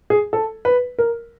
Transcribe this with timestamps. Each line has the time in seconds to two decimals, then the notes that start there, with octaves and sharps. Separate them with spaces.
0.10 G#4
0.33 A4
0.65 B4
0.99 A#4